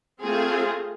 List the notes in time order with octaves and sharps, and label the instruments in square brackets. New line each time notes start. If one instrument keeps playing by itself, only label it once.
[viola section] A3 C4 F4 G#4